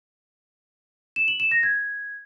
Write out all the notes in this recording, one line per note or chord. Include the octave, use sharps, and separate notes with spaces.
E7
F#7
E7
A#6
G#6